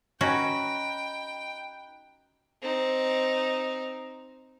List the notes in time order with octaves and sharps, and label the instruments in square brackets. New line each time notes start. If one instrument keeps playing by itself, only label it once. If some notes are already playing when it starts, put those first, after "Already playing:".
[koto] C#4 F#4 [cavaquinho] D#4 B4 [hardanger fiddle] G5
[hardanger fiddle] C4 D#4